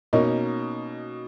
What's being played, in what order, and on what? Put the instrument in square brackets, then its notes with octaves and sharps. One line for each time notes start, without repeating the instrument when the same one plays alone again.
[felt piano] B2 A#3 C#4 D#4